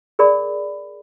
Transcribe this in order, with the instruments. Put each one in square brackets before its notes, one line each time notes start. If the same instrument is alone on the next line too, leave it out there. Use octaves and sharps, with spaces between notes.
[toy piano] G#4 A#4 D5 B5